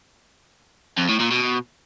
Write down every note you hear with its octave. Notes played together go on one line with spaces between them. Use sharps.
F2
A2
A#2
B2